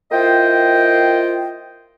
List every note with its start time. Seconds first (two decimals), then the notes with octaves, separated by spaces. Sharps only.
0.12 A#3 E4 F4 C5 D#5 G5